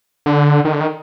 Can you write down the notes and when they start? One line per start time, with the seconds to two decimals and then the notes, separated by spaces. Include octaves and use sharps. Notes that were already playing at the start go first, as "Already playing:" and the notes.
0.26 D3
0.65 D#3
0.73 D3
0.81 D#3